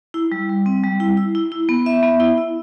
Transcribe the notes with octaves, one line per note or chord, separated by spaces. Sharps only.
E4
G3
G3
C4
G3
E4
E4
E4
E4
B3
E5
B3
E4
E4